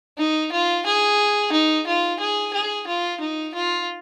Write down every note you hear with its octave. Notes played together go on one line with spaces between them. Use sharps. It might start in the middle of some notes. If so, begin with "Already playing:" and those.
D#4
F4
G#4
D#4
F4
G#4
G#4
F4
D#4
F4